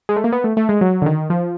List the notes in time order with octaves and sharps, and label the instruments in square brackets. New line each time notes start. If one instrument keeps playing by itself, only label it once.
[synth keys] G#3
A3
A#3
B3
A3
A3
G#3
F#3
D3
D#3
F3